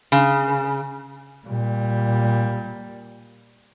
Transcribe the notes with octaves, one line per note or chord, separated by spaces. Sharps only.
C#3
A#2 G3